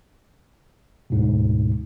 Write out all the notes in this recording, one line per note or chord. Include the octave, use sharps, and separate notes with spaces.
D2 G#2 B2